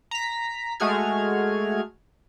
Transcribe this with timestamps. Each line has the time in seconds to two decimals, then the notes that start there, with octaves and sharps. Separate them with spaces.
0.11 A#5 B6
0.80 G#3 A3 F#4 G#4 F6 G#6